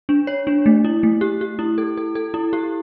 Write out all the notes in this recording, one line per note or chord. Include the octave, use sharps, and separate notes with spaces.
D4
C#5
D4
A3
E4
A3
G4
G4
E4
A4
A4
A4
E4
G4